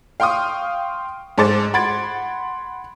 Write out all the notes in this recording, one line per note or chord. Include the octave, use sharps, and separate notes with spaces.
F5 G5 C6 C#6 D#6
G#2 G#4 A4 C5 D6 A6
F#5 B5 C6 G#6 A6 D7